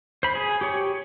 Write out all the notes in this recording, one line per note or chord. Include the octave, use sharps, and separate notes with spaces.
C5 B5
G#4
G4 C#5